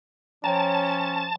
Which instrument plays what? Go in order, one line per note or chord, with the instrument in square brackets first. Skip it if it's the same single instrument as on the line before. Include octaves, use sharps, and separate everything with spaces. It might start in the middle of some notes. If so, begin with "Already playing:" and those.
[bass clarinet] F3 [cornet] C#4 [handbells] C#5 G5 A#5 [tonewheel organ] A5